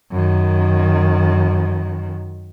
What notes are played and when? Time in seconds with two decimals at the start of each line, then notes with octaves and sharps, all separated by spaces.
0.11 F#2 D#3